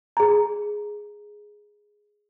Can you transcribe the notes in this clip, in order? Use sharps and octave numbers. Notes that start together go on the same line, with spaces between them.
G#4 A#5